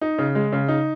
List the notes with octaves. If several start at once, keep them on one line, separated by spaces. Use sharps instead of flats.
D#4
C#3
G#3
C#3
D#4